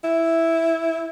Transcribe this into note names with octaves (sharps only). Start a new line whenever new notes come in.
E4